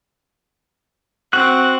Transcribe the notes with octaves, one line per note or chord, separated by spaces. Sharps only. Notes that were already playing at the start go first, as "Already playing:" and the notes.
C4 F#4 F#6